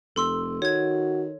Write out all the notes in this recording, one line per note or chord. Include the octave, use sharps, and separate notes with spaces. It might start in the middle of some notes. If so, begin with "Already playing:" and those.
F1 A4 C6 E6
D#3 F#4 C#5 G#6